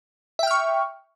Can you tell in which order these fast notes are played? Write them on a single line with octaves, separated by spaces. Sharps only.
E5 G5 F6 C#6